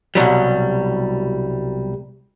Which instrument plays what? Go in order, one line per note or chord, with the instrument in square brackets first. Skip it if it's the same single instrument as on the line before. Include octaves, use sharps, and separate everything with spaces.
[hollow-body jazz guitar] C2 B2 E3 F#3 G3